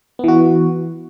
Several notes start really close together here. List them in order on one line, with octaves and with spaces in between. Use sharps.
B3 E3 F#4